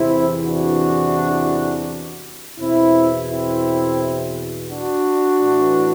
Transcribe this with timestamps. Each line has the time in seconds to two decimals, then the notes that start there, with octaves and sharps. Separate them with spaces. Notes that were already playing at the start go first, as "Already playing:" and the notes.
Already playing: E2 C3 E3 C4 E4
0.46 D4 F#4
2.58 E2 B2 C4 E4
3.29 C4 E4
4.69 D4 F#4
5.41 A2 E3